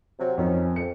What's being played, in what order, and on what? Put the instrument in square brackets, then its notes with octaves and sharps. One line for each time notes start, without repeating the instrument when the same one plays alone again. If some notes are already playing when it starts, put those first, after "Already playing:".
[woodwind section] C3 F#3
[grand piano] F2 [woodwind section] D#3 C#4
[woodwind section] F2 [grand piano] C#7